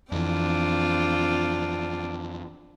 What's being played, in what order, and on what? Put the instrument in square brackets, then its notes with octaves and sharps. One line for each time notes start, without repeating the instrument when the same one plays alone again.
[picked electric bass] F2 E3 [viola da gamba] C4 D4 F4